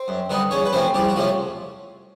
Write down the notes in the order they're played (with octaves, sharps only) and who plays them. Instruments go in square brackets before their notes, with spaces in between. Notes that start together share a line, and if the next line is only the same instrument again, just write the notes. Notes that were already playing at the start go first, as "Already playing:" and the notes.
Already playing: [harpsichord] C4 C5
F#2
D3 G3 B3 D#4
E2 C#4 C#5
B4
C3 F3 A3 C4 C#4 C5
E2 G3 G4
F#4
C3 F3 A3 C#4 F4